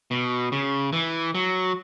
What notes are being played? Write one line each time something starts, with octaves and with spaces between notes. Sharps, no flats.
B2
C#3
E3
F#3